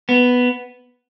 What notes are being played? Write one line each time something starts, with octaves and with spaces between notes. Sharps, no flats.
B3